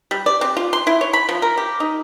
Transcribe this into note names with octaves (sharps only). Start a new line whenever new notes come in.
G3
D5
C4
F4
C6
E4
C#5
B5
F3
A#4
G4
D#4